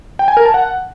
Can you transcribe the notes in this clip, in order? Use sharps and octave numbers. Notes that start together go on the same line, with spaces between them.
G5
G#5
A#4
A5
F#5